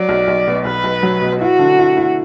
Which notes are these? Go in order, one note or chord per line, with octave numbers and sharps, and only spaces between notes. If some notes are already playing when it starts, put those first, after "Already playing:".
Already playing: F#3 D5
B1
B1
B2
B1 B4
B1
F#3
B2
E4 F#4
D3
E4
E4